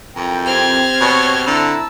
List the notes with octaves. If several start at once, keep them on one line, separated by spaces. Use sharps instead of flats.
F2 E4 A#4 G5 A#5
C4 G4 F6 G#6
B2 C#5 C#6
D3 E4 A5 A#5 E6